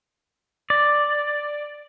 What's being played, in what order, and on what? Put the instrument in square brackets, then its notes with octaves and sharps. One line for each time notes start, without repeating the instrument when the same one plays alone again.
[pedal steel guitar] D5